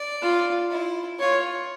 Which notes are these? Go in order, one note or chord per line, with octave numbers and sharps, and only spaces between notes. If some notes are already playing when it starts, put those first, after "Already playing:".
Already playing: D5
F4
E4
F4 C#5